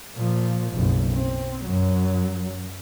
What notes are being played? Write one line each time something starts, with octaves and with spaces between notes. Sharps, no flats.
A#2 F3
F#1 B1
C4
F#2 F#3